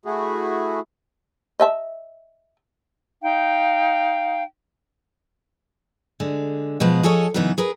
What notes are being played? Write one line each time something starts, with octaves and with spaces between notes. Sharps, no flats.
A3 E4 F#4 G#4
D#5 E5 A5
D#4 F5 G5
D3 G#3
B2 F3 G#3 B4
F3 G#4 A4 C#5 D#5
F#2 C#3 E3 B3 D#4 E4
G#4 A#4 B4